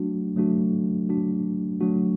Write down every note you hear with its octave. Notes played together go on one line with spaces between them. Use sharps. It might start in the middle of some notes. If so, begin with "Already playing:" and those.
Already playing: F#3 A3 D4 F#4
F#3 A3 D4 F#4
F#3 A3 D4 F#4
F#3 A3 D4 F#4